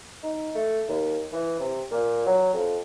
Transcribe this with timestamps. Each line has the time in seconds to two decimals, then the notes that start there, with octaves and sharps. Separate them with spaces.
0.23 D#4
0.55 A3
0.88 D#2
1.32 E3
1.60 C3
1.91 A#2
2.26 F#3
2.54 F2